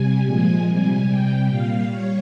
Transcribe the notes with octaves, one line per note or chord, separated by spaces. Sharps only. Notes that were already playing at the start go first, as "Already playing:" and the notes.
Already playing: C3 G3 G#5
A#2 F3 G#3
C3 G3 G#5
C3 G3 G5
A#2 G3 F5
G3 C#5